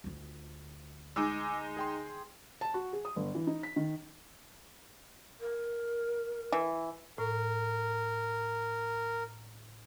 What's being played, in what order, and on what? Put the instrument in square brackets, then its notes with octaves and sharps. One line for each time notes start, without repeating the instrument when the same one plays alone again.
[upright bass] D2 F4
[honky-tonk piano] G#3 D#4 [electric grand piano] G#5 D6 E6
[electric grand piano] G#4 G5 C6
[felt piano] A5
F#4
G#4
D#6
G1
E3
D#4
B6
D#3
[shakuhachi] A#4
[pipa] E3
[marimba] A2 [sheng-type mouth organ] A#4